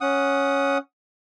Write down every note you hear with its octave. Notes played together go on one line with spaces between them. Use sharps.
C#4 F#5 D#6